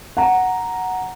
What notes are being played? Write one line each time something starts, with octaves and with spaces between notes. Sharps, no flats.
F#5 A#5